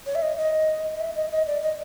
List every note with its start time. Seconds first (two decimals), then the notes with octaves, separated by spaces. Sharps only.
0.06 C#5
0.15 E5
0.22 D#5
0.38 D#5
0.95 D#5
1.00 E5
1.15 D#5
1.31 D#5
1.47 D5
1.62 D#5